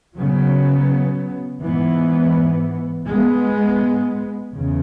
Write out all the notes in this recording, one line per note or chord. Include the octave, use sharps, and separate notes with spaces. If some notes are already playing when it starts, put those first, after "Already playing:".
C#3 F#3 B3
G#2 E3 B3
G#2 G#3 B3
E2 C#3